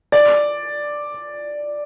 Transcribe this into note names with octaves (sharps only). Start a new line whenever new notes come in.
D5